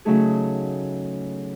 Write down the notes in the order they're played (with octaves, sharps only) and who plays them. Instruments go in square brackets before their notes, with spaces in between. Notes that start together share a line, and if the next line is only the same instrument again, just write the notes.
[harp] C#3 F#3 A3 D#4 G#4